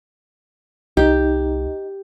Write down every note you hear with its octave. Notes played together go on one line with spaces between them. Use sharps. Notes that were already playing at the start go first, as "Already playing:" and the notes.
C2 D#4 G4